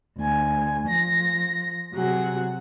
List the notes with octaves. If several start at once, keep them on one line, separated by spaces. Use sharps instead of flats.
D2 G#5
F3 A#6
C3 F#3 G#4 F#5